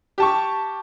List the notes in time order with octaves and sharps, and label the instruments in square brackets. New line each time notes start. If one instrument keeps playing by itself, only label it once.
[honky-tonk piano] G4 A5 C#6